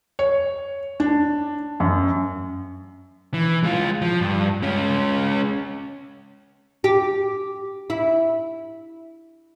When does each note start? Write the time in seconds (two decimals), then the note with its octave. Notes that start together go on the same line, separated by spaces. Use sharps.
0.19 C#5
1.00 D4
1.80 F#2
3.34 E3
3.63 G#3 F4
4.02 F3
4.21 G2
4.63 G#3 C#4
6.84 G4
7.90 E4